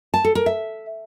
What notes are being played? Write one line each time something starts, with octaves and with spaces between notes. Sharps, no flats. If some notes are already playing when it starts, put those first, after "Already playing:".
A5
A4
A#4
E5